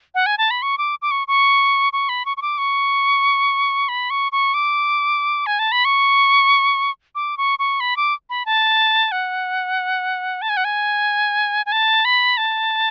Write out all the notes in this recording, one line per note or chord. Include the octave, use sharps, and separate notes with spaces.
F#5
G#5
A5
B5
C#6
D6
D6
C#6
C#6
C#6
B5
C#6
C#6
D6
C#6
B5
C#6
C#6
D6
G#5
A5
B5
C#6
D6
C#6
C#6
B5
D6
B5
A5
F#5
A5
G#5
F#5
G#5
G#5
A5
B5
A5